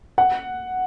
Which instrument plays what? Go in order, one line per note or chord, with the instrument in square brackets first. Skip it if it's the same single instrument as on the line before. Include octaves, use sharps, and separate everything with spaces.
[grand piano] F#5